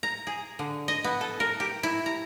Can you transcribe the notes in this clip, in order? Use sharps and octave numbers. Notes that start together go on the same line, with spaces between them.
A#5
G#4
D3
D#5
B3
A4
A#4
G4
E4
A#5